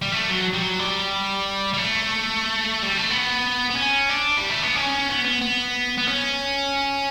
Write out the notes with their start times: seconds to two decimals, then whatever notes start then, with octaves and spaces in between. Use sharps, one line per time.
0.02 G3
0.12 A3
0.29 F#3
0.54 G3
0.62 F#3
0.79 G3
1.74 G3
1.78 A3
2.83 G3
2.97 A3
3.10 B3
3.70 B3
3.76 C#4
4.09 D4
4.37 G3
4.50 A3
4.63 B3
4.76 C#4
5.09 B3
5.25 B3
5.42 B3
5.98 B3
6.08 C#4